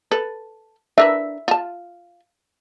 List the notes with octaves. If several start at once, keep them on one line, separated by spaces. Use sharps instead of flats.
A4 B4
D4 A#4 B4 E5
F4 A5